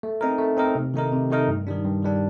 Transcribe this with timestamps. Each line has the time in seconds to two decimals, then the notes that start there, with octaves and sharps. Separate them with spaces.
0.03 A3
0.21 C4 D#4 A#4
0.38 A3
0.57 C4 D#4 A#4
0.75 C3
0.94 D#3 A3 D#4 A#4
1.12 C3
1.31 D#3 A3 D#4 A#4
1.48 G2
1.67 D#3 G3 D4
1.84 G2
2.02 D#3 G3 D4